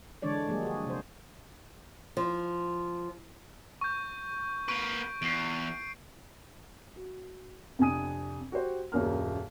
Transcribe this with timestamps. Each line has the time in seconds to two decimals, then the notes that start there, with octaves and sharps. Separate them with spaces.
0.22 D3 E3 G#3 D4 C#5 D5
0.47 F3 G3 G#3 A#3 G#4
0.63 F#4 G#4
0.86 C3 C5
2.17 F3
3.81 C#6 G6
4.69 A#3 B4 C#6 D7
5.22 E2 C7 D7
6.96 F#4
7.79 F2 C3 D4 G#5 D#6 D#7
8.52 F#4 G4 C5
8.92 D#1 A#1 F#2 A#4 F6